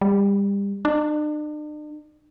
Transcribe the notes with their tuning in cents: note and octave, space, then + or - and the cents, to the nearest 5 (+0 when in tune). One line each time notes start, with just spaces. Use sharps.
G3 +30
D4 +45